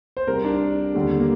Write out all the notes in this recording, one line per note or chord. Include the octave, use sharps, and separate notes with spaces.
C5
C2 C3 G3 A#4
D4
D#2 D3 G3
A#3